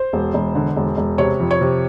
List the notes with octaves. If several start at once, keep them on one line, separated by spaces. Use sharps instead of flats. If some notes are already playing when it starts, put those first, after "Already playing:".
Already playing: C5
E1
E1
D3
E1
E1
C3 C#5
F2
C#5
C3